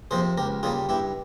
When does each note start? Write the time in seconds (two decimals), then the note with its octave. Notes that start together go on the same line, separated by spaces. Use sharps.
0.11 C3 F3 A#3 G#4 C5
0.37 C#2 G4 A#4
0.63 C#3 G3 A#3 F4 G#4
0.89 G2 E4 G4